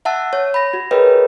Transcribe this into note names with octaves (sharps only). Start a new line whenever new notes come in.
E5 F#5 A5 E6
C#5
B5 A#6
F#4
G#4 A#4 B4 C#5 D#5 G5